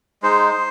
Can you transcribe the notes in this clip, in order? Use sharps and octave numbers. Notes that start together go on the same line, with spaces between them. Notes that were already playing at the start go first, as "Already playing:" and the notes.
G#3 D#4 C5